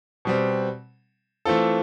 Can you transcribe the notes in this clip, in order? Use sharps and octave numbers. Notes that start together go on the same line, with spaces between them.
B2 G3 C4
E3 A3 C4 F4 A4